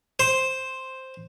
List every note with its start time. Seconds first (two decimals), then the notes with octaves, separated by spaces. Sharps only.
0.20 C5